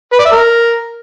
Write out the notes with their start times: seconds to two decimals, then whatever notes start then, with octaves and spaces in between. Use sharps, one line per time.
0.13 B4
0.19 D5
0.25 E5
0.32 A#4